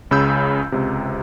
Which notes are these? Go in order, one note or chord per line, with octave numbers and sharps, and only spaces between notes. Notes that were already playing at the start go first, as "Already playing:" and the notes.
C#2 C#3 B5 E6 G6
C#2 C3